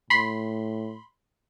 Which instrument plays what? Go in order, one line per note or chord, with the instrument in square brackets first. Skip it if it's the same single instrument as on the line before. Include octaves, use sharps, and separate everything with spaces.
[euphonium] A2 [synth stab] B5 C6